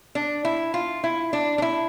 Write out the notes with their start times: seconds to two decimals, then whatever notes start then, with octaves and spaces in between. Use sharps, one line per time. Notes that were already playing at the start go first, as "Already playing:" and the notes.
0.15 D4
0.45 E4
0.74 F4
1.04 E4
1.33 D4
1.58 D4
1.62 E4